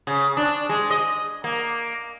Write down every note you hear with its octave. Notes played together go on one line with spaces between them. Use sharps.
C#3
D4
G#3
D#5
A#3